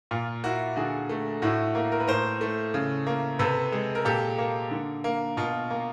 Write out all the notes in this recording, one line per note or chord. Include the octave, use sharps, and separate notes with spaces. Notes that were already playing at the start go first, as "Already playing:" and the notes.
A#2 F4
A#3 E4 F#4
D3 F#4 G#4
A3
A2 E4 F#4
A#3
A#4
B4
A2 A#4 C5
A3
C#3
A#3
C3 A4 B4
G#3
A#4
A#2 G4 A4
A#3
D3
A#3
B2 F4
A#3